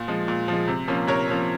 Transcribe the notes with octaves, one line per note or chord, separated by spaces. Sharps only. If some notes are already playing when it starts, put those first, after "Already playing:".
Already playing: A#2
F3 G#3
A#2
F3 G#3
C3
F3 A#3 C#4
C3 A#4 C#5
F3 A#3 C#4